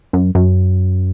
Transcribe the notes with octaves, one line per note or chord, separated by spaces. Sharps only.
F#2
F#2